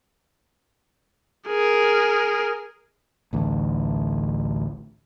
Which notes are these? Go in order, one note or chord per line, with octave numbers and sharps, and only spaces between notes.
G#4 A#4
A1 D2